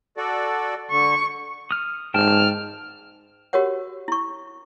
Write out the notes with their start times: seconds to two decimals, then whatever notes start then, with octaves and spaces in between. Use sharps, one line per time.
0.17 F#4 A4 D5
0.91 D3 C#6
1.71 D#6 F6
2.14 G#2 G5 A5 F6
3.53 F#4 G4 A#4 C#5 F#5
4.08 E4 C#6